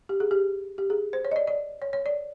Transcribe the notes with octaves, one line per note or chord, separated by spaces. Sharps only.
G4
G#4
G4
G4
G#4
C5
C#5
D#5
D5
D5
C#5
C#5
D5